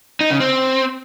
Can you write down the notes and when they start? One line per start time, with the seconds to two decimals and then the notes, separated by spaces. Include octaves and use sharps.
0.21 D#4
0.31 C#3
0.40 C4